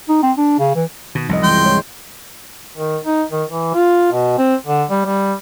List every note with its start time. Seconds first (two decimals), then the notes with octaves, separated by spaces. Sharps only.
0.09 D#4
0.23 C4
0.37 D4
0.59 C#3
0.75 E3
1.15 B2 D#3
1.29 C2 F#2 F3 D#5
1.43 E3 G#3 G5 C6
1.66 G#3 C#5
2.77 D#3
3.04 D#4
3.32 D#3
3.49 E3
3.74 F4
4.12 B2
4.38 C4
4.66 D3
4.90 G3
5.06 G3